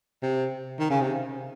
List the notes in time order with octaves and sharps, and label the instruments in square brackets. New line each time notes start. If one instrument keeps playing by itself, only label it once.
[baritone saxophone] C3
D#3
C#3
C3